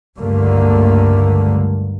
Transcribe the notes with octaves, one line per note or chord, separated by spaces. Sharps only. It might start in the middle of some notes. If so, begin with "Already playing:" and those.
C#2 G2 D3 A3 A#3